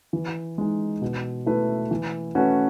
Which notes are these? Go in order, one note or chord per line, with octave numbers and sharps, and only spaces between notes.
E3
G#3 D#4
B2
A3 E4 B4
E3
A3 C#4 F#4 B4